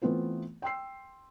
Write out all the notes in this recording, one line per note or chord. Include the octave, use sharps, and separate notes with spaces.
E3 A3 B3 C4 F4 C5
G5 C6 E6 C7